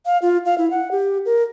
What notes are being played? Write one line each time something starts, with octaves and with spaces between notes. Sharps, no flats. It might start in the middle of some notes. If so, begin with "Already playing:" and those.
F5
F4
F5
E4
F#5
G4
A#4